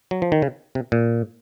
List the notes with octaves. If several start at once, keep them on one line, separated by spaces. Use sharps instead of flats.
F#3
F3
D#3
C#3
C3
A#2